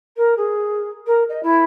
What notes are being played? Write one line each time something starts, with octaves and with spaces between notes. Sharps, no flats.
A#4
G#4
A#4
D#5
E4